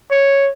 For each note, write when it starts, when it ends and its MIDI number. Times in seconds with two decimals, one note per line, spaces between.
0.11 0.50 73